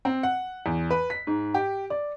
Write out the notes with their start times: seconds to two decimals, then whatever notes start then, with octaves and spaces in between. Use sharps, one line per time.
0.05 C4
0.23 F#5
0.66 E2
0.91 B4
1.10 B6
1.27 G#2
1.54 G4
1.90 D5